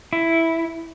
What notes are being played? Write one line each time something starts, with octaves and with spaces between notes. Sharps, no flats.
E4